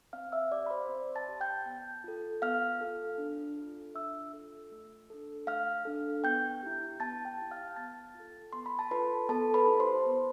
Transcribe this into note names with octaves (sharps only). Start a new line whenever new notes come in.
C4 F5 F6
E5 E6
G4 D5 D6
B5
C5 C6
C4
A5 A6
G4
G5 G6
B3
F4 A4
B3 F5 F6
F4 A4
D4
F4 A4
D4 E5 E6
F4 A4
A3
D4 A4
A3 F5 F6
D4 A4
B3 G5 G6
E4 G4
B3 A5 A6
G5 G6
E4 G4
F5 F6
B3 A5 A6
F4 A4
B3 C6
B5
A5
F4 A4 B4 B5
B3 A4 A5
B4 B5
E4 G4
C5 C6
B3